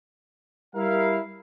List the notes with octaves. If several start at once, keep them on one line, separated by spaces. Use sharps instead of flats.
G3 E4 A#4 F5